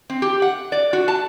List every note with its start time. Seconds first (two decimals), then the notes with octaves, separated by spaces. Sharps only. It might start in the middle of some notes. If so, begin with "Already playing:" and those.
0.10 C4
0.22 G4
0.42 F#5
0.72 D5
0.93 F#4
1.08 A5